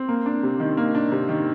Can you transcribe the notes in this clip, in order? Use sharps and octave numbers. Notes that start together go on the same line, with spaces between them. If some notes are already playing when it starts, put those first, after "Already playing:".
Already playing: C4
A#3
D4
C3
D#3
A#3
D4
C3
D#3